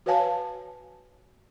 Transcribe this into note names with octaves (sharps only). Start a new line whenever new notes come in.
F#4 B4 C#5 F5 G#5 A5